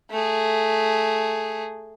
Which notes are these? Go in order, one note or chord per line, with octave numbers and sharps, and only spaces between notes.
A3 G#4